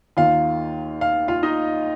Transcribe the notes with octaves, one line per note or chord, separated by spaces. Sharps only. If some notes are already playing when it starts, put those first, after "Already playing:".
D#2 D#3 F4 F5
F5
F4 F5
D#4 D#5